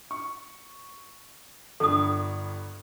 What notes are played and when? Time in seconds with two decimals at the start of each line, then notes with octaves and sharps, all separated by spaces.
0.11 C#6
1.80 G1 G2 A4 D#6